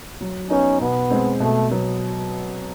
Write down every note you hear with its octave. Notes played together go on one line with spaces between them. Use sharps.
F#3
B3 C#4 D#4
B2 B3
G#3 C4
B2 A3
F#3 B3